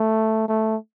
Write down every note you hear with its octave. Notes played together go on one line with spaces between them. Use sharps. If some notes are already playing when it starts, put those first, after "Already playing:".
Already playing: A3
A3